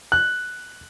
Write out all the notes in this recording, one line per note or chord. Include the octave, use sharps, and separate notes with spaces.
F#6